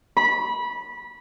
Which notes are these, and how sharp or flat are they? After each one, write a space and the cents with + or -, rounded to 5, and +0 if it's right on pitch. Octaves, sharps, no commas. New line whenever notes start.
B5 -20